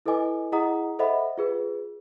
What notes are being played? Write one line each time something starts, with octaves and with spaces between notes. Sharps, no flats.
E4 A4 B4 D#5 G#5 D6
E4 G#4 D#5 F#5 A#5 D#6
A4 C5 D#5 E5 F#5 B5
F4 G#4 B4